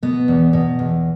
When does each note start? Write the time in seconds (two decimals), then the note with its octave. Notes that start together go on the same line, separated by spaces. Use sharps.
0.03 B2 B3
0.28 E2
0.53 B2
0.79 E2